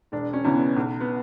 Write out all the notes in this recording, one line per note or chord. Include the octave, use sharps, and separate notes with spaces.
E1 D4
C#4
E2 C#3 E3 C#4
B3
B1
B3